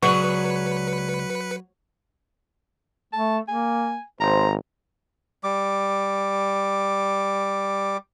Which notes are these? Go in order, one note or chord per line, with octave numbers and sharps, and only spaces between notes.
C#2 F#3 G#4 B4 D5 C#6 C#7
A3 A5
A#3 G#5
G#1 C5 A#5
G3 D6